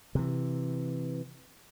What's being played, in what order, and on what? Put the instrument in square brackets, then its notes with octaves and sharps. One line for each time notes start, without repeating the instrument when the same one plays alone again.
[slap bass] C3 E3